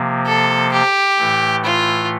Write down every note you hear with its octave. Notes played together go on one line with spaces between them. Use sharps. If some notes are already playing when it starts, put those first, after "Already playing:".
Already playing: C3 F3 A#3
A4
G4
A2 E3 A3
F4